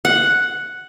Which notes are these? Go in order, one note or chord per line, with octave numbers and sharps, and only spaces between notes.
F#5